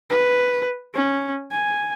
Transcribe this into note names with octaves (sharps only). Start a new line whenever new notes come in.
B4
C#4
G#5